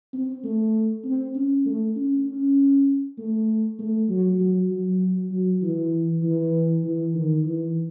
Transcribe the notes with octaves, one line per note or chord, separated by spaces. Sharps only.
C4
A3
C4
C#4
A3
C#4
C#4
A3
A3
F#3
F#3
F#3
F#3
E3
E3
E3
D#3
E3